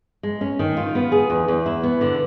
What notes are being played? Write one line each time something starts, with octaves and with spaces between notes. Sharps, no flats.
G#3
C#4
D#3
F4
B3
G#4
E2
E2
E4
B3
D3